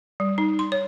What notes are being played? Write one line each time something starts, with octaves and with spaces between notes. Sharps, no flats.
G3
D#4
C6
C#5